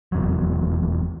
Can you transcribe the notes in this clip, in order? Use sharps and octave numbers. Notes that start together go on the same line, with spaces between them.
F1 E2 F#3